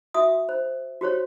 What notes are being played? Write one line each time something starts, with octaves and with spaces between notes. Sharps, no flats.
F#4 E5 D#6
C5
F#4 G4 C5 C#5